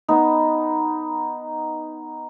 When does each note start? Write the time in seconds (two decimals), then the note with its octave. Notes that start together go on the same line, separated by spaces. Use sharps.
0.08 B3 D#4